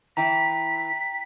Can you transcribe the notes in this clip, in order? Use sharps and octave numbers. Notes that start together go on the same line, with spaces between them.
E3 E4 G5 A#5 B6